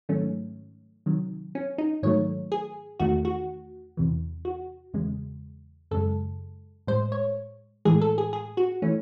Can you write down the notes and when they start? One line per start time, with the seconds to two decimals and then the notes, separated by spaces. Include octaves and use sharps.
0.09 G#2 D#3 F#3 A3 C#4
1.06 C3 D#3 F#3
1.55 C#4
1.78 D#4
2.03 G#2 D#3 F#3 A3 C#5
2.52 G#4
3.00 E2 D#3 A3 F#4
3.25 F#4
3.97 E2 C3 E3
4.45 F#4
4.94 E2 C#3 G#3
5.91 F#2 C#3 G#3 A4
6.87 A2 G#3 C5
7.12 C#5
7.85 A2 E3 G#3 G#4
8.01 A4
8.18 G#4
8.33 G#4
8.57 F#4
8.82 E3 A3 C#4